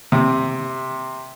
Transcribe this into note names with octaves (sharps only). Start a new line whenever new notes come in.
C3